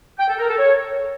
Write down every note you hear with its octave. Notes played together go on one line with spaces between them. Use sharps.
G5
A4
A#4
A4
C#5